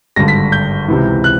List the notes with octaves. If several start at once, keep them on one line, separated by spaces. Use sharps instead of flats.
G#1 G2 D3 A#6
B6
G6
C#2 C3 E3
F#6